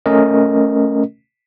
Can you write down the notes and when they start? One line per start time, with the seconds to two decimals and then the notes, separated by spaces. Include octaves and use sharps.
0.06 A3 C#4 A#4 D#5